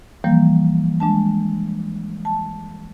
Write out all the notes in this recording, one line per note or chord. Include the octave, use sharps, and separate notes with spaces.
E3 F3 G3 A#3
G#3 D4 A5
A5